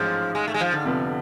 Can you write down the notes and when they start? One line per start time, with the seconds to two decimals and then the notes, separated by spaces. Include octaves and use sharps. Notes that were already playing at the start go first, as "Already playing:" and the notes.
Already playing: A1 G#2 F3 G#3
0.35 G#3
0.48 A3
0.54 G#3
0.61 F3
0.72 D3
0.84 F2 C3 F3 B3